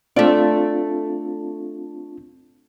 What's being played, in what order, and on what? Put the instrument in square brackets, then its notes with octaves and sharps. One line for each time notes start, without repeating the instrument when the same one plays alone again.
[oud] A3 D5 [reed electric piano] C4 D4 F4